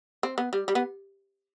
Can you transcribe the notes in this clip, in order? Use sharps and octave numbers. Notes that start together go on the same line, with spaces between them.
C4
B3
G3
G3
B3